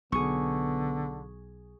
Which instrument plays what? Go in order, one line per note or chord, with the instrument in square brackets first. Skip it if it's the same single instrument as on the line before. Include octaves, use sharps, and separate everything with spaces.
[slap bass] B1 [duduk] D3 [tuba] B3 [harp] G#4 C#6